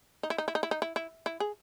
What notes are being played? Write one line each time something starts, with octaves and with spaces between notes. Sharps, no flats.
D#4
E4
D#4
E4
D#4
E4
D#4
E4
E4
E4
G#4